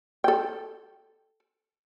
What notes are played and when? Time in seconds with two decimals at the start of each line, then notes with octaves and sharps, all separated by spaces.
0.24 A4 G5